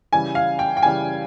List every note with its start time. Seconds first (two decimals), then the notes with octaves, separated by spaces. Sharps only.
0.12 C#3 E3 G3 G#5
0.35 F5
0.59 G5
0.77 G5
0.83 C#3 E3 G3 G#5